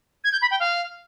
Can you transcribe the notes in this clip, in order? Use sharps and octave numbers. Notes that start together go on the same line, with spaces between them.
G#6
G6
B5
G5
F5